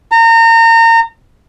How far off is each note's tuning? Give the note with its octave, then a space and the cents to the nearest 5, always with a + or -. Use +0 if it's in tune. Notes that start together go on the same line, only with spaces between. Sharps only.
A#5 -30